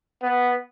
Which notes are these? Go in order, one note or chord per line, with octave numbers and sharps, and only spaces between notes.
B3